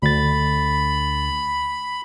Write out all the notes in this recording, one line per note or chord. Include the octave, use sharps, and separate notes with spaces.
D2 B5 A6